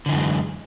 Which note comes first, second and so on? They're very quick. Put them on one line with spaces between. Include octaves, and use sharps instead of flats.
D3 E3 F#2 G#3